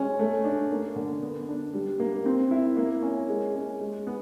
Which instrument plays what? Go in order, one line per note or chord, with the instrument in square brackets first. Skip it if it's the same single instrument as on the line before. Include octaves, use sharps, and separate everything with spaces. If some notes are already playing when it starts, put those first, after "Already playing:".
Already playing: [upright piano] G#3 C#4
A3
D4
A#3
D3
B3
D4
G3
A#3
C4
E4
A#3
C#4
G#3
C#4
G#3
B3